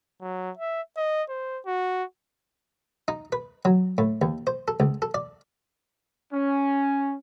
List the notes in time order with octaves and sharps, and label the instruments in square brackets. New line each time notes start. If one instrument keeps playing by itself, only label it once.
[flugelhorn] F#3
E5
D#5
C5
F#4
[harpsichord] D#4
B4
F#3
A2
D#2
C5
A4
C#2
A4
D5
[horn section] C#4